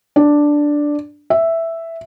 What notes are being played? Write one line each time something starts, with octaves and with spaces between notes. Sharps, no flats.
D4
E5